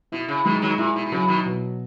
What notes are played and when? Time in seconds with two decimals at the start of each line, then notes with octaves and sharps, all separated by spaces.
0.12 B2 E4
0.28 C#3
0.45 B2 D#3 G#3
0.62 D#3 F#3
0.78 A#2 E4
0.96 B2
1.06 B2
1.12 C#3 F#3
1.28 B2 D#3
1.45 B2